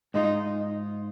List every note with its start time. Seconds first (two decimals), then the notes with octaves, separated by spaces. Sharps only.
0.14 G#2 G#3 D#4 F4